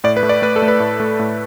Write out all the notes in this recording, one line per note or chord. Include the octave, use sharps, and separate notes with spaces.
A2 D5
B4
A3
D5
A3 B4
A4
A3
B4
A2
A3
A2